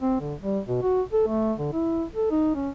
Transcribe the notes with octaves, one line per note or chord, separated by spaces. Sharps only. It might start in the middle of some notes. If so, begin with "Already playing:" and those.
C4
D3
G3
B2
F#4
A4
A3
D3
E4
A4
D#4
C#4